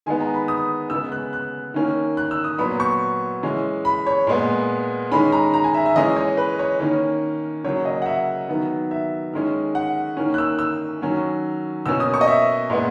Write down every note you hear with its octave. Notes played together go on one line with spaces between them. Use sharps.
D#3 G#3 B3 G#5
A#5
B5
D#6
C#3 G#3 B3 E6
F#6
F#6
D#3 A#3 C#4
F#6
E6
D#6
A#2 F#3 B3 B5
C#6
E3 G#3 C#4
B5
C#5
A#2 G#3 B3
D#3 G#3 C#4 B5
A#5
A#5
G#5
E5
E5
E3 G#3 C#4 D#5
C#5
B4
C#5
D#3 A#3 C#4 C#5
C#3 F#3 A#3 C#5
D#5
F#5
E5
D#3 F#3 B3
E5
D#3 G#3 C#4
F#5
D#3 A#3 C#4
F#6
E6
E6
D#3 F#3 C#4
B2 A#3 C#4 E6
D#6
C#6
D#5
E5
A#2 G#3 B3